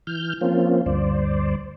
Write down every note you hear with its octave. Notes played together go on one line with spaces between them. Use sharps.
E3 F6 G6
F3 A#3 C4 C#4 F4
D2 G2 C5 D5